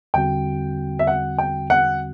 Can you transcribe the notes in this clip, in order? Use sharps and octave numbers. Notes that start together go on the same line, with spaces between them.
E2 D3 G3 C4 F#4 G5
E5
F#5
G5
F#5